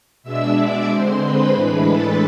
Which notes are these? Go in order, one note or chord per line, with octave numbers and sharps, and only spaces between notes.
B2 G#3 D4 E5 E6
D5 D6
D3 G#3 C4 C5 C6
B4 B5
A2 E3 G#3 D4
A4 A5